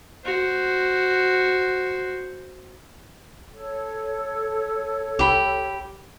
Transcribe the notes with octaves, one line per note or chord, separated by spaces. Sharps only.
F#4 C5
A4 C#5
C2 G4 B5